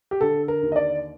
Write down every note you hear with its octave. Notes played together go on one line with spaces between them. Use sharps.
G4
D3 A4
A#4
D#2
D#5
D5